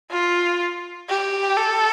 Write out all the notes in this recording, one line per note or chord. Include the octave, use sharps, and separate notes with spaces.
F4
G4
A4